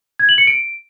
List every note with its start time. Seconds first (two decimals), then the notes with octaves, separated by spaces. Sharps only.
0.19 G#6
0.29 F#7
0.38 C#7
0.47 D7